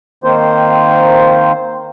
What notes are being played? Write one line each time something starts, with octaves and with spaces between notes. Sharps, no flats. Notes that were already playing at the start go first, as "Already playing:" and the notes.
D#3 A#3 C4 C5